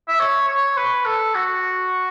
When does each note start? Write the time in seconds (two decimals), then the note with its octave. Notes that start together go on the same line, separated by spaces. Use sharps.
0.08 E5
0.20 C#5
0.48 C#5
0.77 B4
1.06 A4
1.35 F#4